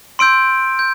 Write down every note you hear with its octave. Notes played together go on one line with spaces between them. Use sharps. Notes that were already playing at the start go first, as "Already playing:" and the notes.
C6 E6 G6 D7
G6